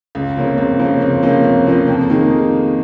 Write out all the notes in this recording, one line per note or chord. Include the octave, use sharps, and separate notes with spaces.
C#2
C3 F3 A#3 C#4
C#2
C3 F3 A#3 C#4
C#2
C3 F3 A#3 C#4
C#2
C3 F3 A#3 C#4
F2
D#3 A#3 D#4 G#4